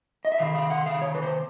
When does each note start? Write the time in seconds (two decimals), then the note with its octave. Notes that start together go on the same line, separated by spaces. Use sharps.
0.25 D#5
0.32 E5
0.39 C3 D#3 F5
0.55 F5
0.70 F#5
0.86 F5
1.02 C#5
1.15 B4
1.22 C5